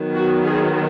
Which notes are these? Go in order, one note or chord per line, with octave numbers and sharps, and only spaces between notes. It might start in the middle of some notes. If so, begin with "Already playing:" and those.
Already playing: D#3 F#3 B3
F#4
G#4